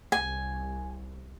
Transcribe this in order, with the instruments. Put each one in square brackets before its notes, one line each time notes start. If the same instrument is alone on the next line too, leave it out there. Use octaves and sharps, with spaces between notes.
[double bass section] C2 [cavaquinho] G#5